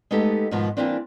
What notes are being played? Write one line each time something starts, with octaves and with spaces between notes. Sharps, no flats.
G#3 A3 B3 D#4 G4 A4
G#2 B2 D#3 F3
E3 G3 A3 A#3 C4 D4